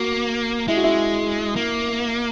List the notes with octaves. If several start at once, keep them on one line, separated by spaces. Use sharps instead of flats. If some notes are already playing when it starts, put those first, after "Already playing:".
Already playing: A#3 F#4
G#3 E4
F#4
E4
A#3